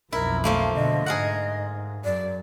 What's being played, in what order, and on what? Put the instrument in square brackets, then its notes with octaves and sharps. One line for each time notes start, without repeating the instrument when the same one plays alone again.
[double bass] B1 F2 [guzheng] E4 [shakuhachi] A#4
[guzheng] F3 A3 A#3 [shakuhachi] F5
[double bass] B2 D3 [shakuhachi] D#5
[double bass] G#2 [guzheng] G#4 A#4 F#5
[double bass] F#2 [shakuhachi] D5